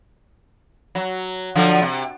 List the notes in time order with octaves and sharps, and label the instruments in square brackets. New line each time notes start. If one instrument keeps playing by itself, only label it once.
[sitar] F#3
D3 F3 F#3
C3